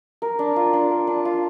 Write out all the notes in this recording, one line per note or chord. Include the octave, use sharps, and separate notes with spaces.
A#4
D4
F4
D4
A#4
D4
F4